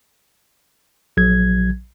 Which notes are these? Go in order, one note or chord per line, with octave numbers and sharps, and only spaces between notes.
A#1 F#3 G#6